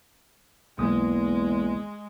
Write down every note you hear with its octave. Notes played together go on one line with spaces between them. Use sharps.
B1 E2 G#3 A#3 D#6